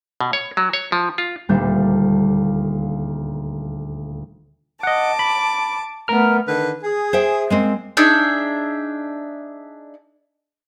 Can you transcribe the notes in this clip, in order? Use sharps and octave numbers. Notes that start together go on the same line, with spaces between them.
B2
C#5
F#3
C#5
F3
F4
D#1 D2 G3 A#3 D4 G6
D#5 F#5 A5 D6
B5
A3 B3 A#4 F6
D3 D#3 B4
G#4
C5 E5 G5
G#3 A#3 C4
D4 D#4 G#4 E5